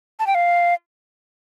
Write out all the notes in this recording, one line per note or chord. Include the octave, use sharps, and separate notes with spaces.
A5
G5
F5